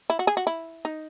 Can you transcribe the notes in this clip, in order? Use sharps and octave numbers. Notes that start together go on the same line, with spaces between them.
E4
F#4
G#4
F#4
E4
D#4